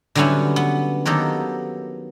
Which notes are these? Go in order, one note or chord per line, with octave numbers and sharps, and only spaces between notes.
D3 F#3 G3 B3 C#4 E4
B3
D#3 F#3 A#3 B3 G4 A4